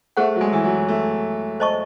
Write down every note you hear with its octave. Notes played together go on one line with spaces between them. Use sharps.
A3 G#4 C5 F#5
F#3
G#3
E3
F#3
A3
C5 D#5 A5 C#6